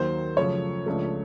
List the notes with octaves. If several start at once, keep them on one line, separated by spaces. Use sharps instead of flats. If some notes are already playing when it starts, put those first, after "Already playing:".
Already playing: D#2 D#3 F#3 A#3 C5
F#2 C#3 F3 A3 C#5
C#2 C#3 F3 A3 D4